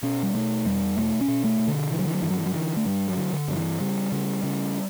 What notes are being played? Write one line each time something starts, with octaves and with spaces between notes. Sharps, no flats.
B2 C#4
G3
B2 A3
E2 G3
B2 A3
C#4
B2
A3
B2
D3
D3 E3
F#3
E3
F#3
G2 E3
F#3
E3
F#3
D3 E3
A3
G2 G3
F#3
D3
D3
G2 F#3
E3
C#3 G3
C#3
C#3